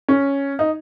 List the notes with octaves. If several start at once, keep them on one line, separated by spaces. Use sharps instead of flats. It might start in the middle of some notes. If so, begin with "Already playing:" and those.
C#4
D#4